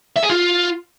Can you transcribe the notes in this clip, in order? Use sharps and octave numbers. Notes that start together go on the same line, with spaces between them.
E5
G#4
F4